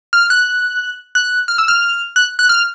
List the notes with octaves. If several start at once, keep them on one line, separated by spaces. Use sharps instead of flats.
F6
F#6
F#6
F6
E6
F6
F#6
F#6
F6